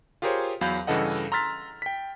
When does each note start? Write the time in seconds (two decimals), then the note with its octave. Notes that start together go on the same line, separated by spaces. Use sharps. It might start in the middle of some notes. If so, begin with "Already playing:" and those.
0.22 F4 G4 G#4 A#4 C5 C#5
0.61 E2 F#3 F5 B5 G6
0.87 G2 C#3 E3 A4 D#5 F#5
1.32 A#5 C6 E6 F6 A6 B6
1.82 G5 B6